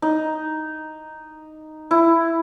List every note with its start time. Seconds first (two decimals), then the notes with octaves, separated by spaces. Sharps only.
0.02 D#4
1.91 E4